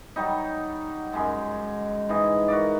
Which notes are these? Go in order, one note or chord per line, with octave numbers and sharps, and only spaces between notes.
F#3 G3 D#4
F#2 G#3
G#2 E3 D#5
F#4 A#4 D5